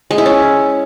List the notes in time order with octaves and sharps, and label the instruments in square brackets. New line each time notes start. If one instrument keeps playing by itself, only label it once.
[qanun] G#3
E4
C#4